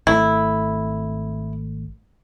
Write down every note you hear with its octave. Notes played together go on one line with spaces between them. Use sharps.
G#1 A3 E4